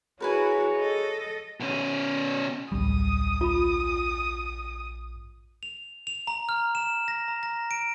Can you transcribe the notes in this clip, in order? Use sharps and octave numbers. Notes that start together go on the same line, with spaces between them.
E4 F#4 G#4 A#4 B4 C#5 G#5
A4 D#5
B2 C#4
D1 A#1 G3 D#6
F4 B5
F7
F7
A#5
F6
E7
A#6
A#5
A#6
D7